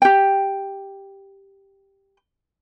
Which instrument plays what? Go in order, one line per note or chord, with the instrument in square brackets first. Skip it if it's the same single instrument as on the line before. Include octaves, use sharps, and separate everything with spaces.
[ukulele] G4 G5